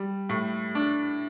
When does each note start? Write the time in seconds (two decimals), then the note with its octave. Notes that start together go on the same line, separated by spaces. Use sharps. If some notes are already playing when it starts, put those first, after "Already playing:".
Already playing: G3
0.29 A2
0.75 D4